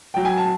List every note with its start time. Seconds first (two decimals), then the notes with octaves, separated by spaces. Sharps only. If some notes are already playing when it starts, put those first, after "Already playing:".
0.14 F#3 G5
0.25 G#5
0.37 A5